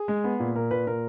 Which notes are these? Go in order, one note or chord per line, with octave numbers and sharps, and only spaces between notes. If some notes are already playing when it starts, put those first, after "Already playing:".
Already playing: G#4
G#3
B3
A#2
A#2 A#4
A#2 B4
A#2 A#4